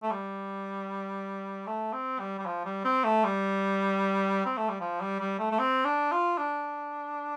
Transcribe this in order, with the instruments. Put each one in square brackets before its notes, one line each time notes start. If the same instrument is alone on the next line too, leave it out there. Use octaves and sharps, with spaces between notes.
[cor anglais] A3
G3
A3
C4
G3
G3
F3
G3
C4
A3
G3
C4
A3
G3
F3
G3
G3
A3
A3
C4
D4
F4
D4